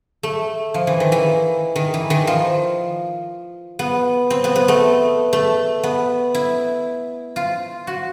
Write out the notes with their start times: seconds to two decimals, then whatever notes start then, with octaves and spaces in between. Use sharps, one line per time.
0.23 A3
0.74 F3
0.87 E3
1.00 D#3
1.12 E3
1.76 D#3
1.94 E3
2.10 D#3
2.27 F3
3.79 B3
4.30 C4
4.44 B3
4.56 B3
4.68 A3
5.33 A3
5.84 B3
6.34 E4
7.36 F4
7.87 F#4